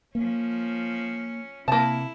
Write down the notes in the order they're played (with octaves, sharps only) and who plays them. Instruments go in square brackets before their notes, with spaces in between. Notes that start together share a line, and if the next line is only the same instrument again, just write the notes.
[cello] F3 C#4 [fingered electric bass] A#3
[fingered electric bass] C3 [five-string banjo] A#3 A5 [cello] E4